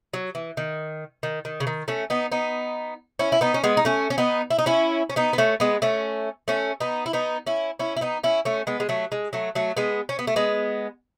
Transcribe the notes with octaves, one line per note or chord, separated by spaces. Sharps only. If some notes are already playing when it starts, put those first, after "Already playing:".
F#3
E3
D#3
D#3
D#3
C#3
D#3
A3 C#4
B3 D#4
B3 D#4
C#4 E4
E4
B3 D#4
C#4
G#3 B3
D#4
A3 C#4
C#4
B3 D#4
E4
D#4
C#4 E4
C#4
B3 D#4
B3
A3 C#4
G#3 B3
A3 C#4
A3 C#4
B3 D#4
E4
B3 D#4
C#4 E4
C#4 E4
E4
B3 D#4
C#4 E4
A3 C#4
G#3 B3
G#3
F#3 A3
G#3
F#3 A3
F#3 A3
G#3 B3
C#4
B3
A3
G#3 B3